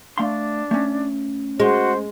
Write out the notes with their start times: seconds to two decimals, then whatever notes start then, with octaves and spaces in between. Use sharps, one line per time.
0.18 A3 D4 F5 C6
0.71 A3 C#4
1.60 G#3 F#4 C5